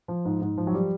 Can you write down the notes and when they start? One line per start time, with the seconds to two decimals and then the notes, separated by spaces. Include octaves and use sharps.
0.08 F3
0.25 G#2
0.42 G#2
0.58 F3
0.67 F#3
0.74 G3